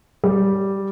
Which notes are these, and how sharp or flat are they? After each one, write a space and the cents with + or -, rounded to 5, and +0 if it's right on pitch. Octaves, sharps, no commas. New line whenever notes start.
G3 -5